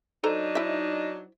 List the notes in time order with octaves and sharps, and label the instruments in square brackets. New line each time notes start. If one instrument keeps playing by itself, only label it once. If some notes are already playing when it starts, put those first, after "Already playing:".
[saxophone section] F#3 D4 D#4 [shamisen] A4 C5 A#5
[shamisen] E4 C5 E5